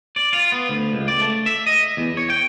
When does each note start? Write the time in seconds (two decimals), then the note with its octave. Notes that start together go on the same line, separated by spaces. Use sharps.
0.16 D5
0.33 F4
0.52 B3
0.69 D2
0.93 C#2
1.08 D5
1.20 A3
1.46 E5
1.67 D#5
1.97 E2
2.17 C#5
2.30 G5